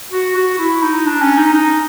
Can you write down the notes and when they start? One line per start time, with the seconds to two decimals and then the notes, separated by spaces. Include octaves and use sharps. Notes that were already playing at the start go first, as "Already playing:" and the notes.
0.12 F#4
0.35 F#4
0.59 E4
0.82 D#4
1.06 D4
1.22 C#4
1.38 D#4
1.53 D#4